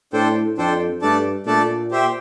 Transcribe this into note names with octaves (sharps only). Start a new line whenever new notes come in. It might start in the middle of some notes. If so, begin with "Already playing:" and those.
A2 D4 A4 C5 G5
F2 D4 A4 C5 G5
G2 A3 D4 A4 D5 A5
A#2 A3 D4 A4 D5 A5
G4 C5 E5 G5